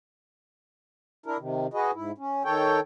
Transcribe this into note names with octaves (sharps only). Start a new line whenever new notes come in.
D4 E4 A#4
C3 D#3
F#4 G#4 B4 D#5
G#2 E4
C#4
D#3 A4 C#5 G5